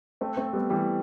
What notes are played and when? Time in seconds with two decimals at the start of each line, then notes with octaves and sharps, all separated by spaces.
0.21 A3 C4
0.37 A3 C4
0.53 G3 B3
0.70 E3 G3